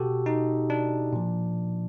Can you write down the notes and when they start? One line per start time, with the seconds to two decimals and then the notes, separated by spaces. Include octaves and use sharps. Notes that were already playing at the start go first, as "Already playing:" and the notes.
Already playing: B2 F#4 G4 A4
0.26 D#4
0.70 D4
1.13 A#2 F3